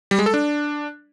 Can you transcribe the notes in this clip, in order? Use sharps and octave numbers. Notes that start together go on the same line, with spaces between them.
G3
G#3
A4
D4